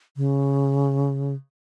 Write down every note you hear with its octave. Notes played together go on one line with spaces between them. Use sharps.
C#3